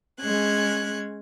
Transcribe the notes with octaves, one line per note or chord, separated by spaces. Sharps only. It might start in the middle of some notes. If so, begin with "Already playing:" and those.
G#3 C#4 F#6 G#6